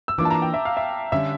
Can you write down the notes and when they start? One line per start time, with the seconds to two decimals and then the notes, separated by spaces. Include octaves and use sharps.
0.08 E6
0.18 E3 A#3 D4 F4 D6
0.25 A5
0.30 A#5
0.42 G5
0.54 E5
0.65 F5
0.77 E5
1.12 D3 G3 C#4 E5